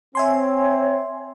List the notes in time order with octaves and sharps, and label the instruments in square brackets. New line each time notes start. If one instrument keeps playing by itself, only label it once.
[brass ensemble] C4 [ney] C#5 [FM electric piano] E5 G#5 C6